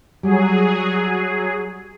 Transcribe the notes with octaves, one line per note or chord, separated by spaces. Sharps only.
F#3 G3 G#4